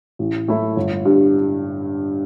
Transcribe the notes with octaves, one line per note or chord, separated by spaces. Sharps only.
A1
A2 A3 E4
G1
G2 G3